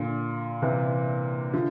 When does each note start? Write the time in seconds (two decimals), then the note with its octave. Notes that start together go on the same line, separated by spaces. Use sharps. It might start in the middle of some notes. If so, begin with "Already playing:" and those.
Already playing: A#2 D3
0.62 C3 E3
1.53 D3 F3